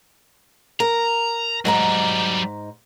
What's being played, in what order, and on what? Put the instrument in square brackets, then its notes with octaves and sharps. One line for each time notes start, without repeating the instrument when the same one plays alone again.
[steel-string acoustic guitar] A#4 [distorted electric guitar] A#5
[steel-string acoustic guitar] G#2 A#4 A#5 [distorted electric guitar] F#3 G3